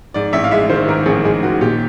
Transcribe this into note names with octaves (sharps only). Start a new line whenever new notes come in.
G#2 D5
A1 E5
F5
G#3 E5
D#3 C5
G#2 A#4
A1 G#4
G#3 G#4
D#3 F#4
A#2 G4